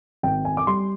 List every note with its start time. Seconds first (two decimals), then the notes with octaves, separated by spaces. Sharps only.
0.23 G#1 G5
0.45 G#5
0.57 D6
0.67 G3 C6